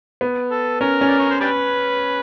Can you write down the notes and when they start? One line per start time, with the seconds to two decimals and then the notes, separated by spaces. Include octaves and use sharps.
0.21 B3
0.51 A4
0.81 C#4 A#4
1.01 C#4
1.08 D5
1.19 C#5
1.30 C5
1.41 D4 G4 B4